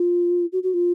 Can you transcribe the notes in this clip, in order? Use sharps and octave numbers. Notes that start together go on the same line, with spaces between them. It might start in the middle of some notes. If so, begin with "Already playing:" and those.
Already playing: F4
F#4
F#4
F4